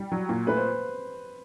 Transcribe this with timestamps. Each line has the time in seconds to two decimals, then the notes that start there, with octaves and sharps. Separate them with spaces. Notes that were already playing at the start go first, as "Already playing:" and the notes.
Already playing: G3
0.12 F#3
0.29 A#2
0.47 A3 B4
0.57 C5